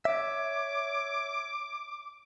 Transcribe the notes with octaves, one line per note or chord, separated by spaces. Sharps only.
C#5 E5 D6